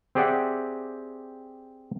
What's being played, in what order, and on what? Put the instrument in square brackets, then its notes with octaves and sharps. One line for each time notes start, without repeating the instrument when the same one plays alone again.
[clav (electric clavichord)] C4 G4 G#4 D5 E5 F#5